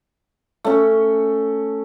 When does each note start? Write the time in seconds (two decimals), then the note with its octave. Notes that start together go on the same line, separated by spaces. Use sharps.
0.64 A3 C#4